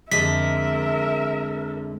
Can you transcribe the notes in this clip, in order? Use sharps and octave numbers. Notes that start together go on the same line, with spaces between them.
F2 D3 G#3 A#4 E5 B6